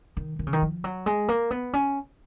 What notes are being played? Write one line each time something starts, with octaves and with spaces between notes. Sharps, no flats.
D#3
D#3
C#3
D#3
F3
F#3
G#3
A#3
B3
C#4